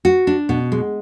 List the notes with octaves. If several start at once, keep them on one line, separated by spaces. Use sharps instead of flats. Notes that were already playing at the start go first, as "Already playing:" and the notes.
F#4
D4
B2
G#3